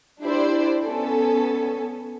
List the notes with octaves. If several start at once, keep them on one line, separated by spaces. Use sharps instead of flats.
D4 E4 G4 C5 D5
B3 C#4 A4